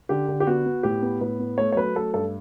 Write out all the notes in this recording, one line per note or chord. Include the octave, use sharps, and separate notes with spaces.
D3 G4
D3
G4
B3 F#4
B3
A2 G4
B3
A2 B4
B3
A3 C#5
C#5
F#3 B4
A3 A4
G2 A4